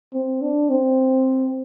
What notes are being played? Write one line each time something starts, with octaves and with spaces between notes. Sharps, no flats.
C4
D4
C4